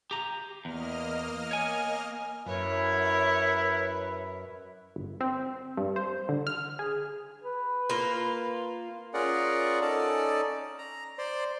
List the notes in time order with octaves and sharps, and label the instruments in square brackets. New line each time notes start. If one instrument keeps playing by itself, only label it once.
[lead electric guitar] G4 A#5
[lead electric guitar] E2 [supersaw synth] A#3 D#5 F6
[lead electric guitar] C#5 G#5
[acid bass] F#2 [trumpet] E4 [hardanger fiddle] A#4 C#5 [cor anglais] B4
[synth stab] G1
C4
G2
C5
D3
F6
G#4
[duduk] B4
[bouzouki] A#3 F4
[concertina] C#4 F4 G#4 A#4 D5 F#5
C#4 D#4 A4 D5 A5
A#5
C5 D5 C6